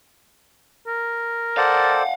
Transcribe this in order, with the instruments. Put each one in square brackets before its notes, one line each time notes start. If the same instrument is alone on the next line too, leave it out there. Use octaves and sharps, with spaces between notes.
[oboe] A#4
[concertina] A4 C5 D5 [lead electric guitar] F5 F#5